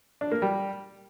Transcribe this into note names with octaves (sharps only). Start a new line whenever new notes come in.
D4
A#3
G3